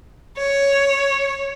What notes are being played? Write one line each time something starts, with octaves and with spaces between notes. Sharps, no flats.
C#5